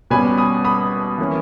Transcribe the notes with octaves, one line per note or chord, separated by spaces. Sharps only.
B2 G3 C#4 G#5 B5
B5 D#6
B5 D#6
E3 A#3 C#4